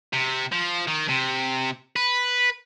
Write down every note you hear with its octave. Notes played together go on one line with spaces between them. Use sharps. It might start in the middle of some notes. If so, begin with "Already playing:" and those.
C3
F3
D#3
C3
B4